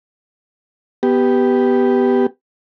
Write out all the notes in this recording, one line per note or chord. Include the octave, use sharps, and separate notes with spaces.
B3 G4